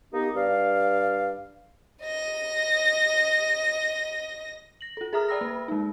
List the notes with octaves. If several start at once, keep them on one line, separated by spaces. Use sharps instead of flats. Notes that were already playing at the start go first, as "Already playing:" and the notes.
A#3 B3 D#4 G4
G2 D5 F5
D#5 A#6
A#6 F#7
F4 A4
G#4 A#4 E5 A#5 D#6 F6
D5 G5 B5 E6 A#6
A#3
G#3 D#4